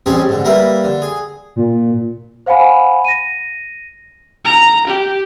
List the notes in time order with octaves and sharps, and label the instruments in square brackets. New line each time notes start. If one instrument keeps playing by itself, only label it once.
[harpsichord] A1 G3 C4 C#4 G#4 A5
G#2 D3
G3 A#3 A#4 B4 E5
D3
G#4
[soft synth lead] A#2
[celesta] C5 F5 F#5 G#5 B5
A#6 D#7
[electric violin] A#5
G4